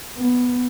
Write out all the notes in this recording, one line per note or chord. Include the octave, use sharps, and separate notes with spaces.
B3